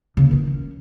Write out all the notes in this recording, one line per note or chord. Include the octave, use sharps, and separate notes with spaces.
C#3 A#3
D#3 E3
C#4